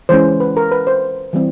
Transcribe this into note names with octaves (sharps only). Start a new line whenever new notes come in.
E3 G#3 C#4 C5
B4
A#4
B4
C5
E3 G3 C4